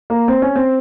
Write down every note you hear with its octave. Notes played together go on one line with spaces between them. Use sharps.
A#3
C4
C#4
C4